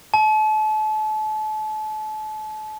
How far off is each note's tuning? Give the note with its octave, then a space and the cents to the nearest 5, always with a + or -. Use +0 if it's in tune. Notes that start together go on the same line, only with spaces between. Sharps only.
A5 -35